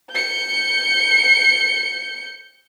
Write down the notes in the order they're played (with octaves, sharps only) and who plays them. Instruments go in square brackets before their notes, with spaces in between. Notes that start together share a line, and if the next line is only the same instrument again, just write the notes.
[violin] G6 C#7